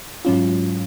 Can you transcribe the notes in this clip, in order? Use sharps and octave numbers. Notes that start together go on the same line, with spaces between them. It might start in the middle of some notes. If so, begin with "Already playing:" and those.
G#2 F#3 C#4 F4